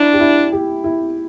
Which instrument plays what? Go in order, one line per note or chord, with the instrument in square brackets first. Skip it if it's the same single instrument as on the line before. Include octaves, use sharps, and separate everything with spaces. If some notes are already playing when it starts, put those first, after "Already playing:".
Already playing: [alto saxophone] D4 [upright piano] E4
[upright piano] G4
E4
G4
E4